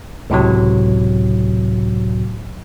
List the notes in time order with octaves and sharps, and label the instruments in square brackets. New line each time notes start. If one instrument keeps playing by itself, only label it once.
[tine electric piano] C#2 A2 C3 F#3